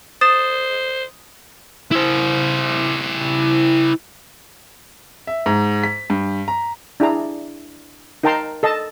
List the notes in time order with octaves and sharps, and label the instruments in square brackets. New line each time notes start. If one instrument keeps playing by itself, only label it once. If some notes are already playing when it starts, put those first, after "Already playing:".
[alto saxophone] C5 [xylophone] D#6 A6 E7
[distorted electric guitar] E4 C5
[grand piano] E5
G#2
B6
G2
A#5
[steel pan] D4 E4 G#4 A#5
D#4 A#4 G5 A5 A#5 C6
A4 D#5 A5